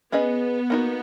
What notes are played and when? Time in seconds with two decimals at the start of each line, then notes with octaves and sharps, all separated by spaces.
0.12 B3 C#4 G#4 B4 D#5
0.70 A#3 D#4 F#4